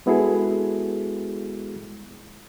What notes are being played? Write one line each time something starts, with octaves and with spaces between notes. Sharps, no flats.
G#3 B3 E4 F#4 G#4 A4